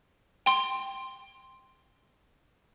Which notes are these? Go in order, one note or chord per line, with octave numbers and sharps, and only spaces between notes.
G5 C6